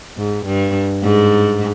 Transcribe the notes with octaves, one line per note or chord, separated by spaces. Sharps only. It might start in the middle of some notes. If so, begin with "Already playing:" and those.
G#2
G2
G#2